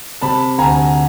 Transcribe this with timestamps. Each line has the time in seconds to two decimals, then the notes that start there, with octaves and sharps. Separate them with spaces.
0.21 C3 A5 B5
0.58 D2 G#5 A#5